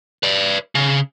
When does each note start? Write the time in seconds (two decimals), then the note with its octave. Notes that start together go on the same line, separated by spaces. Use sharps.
0.23 B4 D5
0.75 C#3